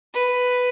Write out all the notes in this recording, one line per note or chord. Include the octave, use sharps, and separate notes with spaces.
B4